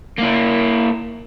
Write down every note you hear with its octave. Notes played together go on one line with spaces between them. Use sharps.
A#3 E4